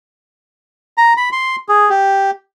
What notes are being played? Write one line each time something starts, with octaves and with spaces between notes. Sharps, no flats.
A#5
B5
C6
G#4
G4